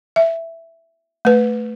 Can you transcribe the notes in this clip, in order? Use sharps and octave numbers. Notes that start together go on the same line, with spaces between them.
E5
A3 B4